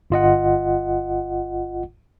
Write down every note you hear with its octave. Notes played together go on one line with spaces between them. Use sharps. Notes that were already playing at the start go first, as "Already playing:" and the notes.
G1 F4 D#5 F#5